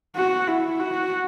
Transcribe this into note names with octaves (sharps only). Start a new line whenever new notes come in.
F#4
E4
F#4